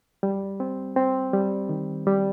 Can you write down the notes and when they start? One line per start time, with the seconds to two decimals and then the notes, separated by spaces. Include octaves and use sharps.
0.23 G3
0.60 C4
0.96 C4
1.33 G3
1.69 D#3
2.07 G3